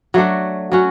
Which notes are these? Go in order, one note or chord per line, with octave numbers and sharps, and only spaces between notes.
F#3 A3 D4 F#4
F#3 C#4 F#4